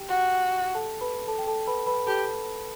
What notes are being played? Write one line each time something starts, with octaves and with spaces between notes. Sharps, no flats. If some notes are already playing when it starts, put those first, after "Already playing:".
Already playing: G4 G5
F#4
A4 A5
B4 B5
A4 A5
G5
A4 A5
B4 B5
B4 B5
G4 A4 A5